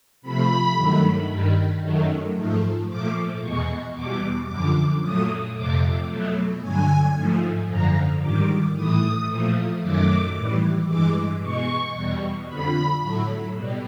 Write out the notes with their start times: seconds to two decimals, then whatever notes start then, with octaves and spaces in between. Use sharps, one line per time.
0.22 C3 F3 A3 B5
0.76 G2 D#3 F#3 A3
1.29 G2 D#3 G3
1.82 F#2 D#3 F#3 A3
2.36 G#2 F3 A3
2.89 A#2 F3 A3 D6
3.41 E2 B2 G#3 C#6
3.95 E2 B2 G3 D6
4.48 F#2 D3 F3 D6
5.02 A#2 F#3 A3 D#6
5.55 F2 C3 F3 A3 D6
6.08 B2 F#3 A3
6.62 G2 D3 F#3 G#5
7.15 G#2 F3 A3
7.68 F#2 D3 F3 A#5
8.21 G#2 D#3 G3 D6
8.74 A2 E3 A3 D#6
9.28 A#2 F3 A3
9.81 F#2 D#3 F#3 A3 D6
10.35 A2 E3 G3
10.88 G2 E3 G#3 D6
11.41 B2 G#3 C#6
11.94 E2 B2 G3
12.47 F2 D3 F3 B5
13.01 A2 F#3 A3
13.55 B2 G3